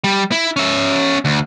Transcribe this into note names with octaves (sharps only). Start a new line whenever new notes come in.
G3
E4
C#4 E5
D2